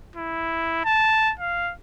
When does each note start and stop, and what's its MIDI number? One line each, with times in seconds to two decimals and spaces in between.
0.16 0.82 64
0.85 1.33 81
1.39 1.72 77